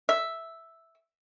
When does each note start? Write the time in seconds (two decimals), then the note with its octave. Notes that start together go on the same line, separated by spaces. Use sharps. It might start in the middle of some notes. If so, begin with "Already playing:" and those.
0.09 E5